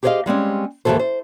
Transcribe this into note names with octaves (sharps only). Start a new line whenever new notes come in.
G4 G#4 C5 C#5 D#5 F5
G3 G#3 C4 C#4
D#2 G#2 C#3 E3 A4 C5
C5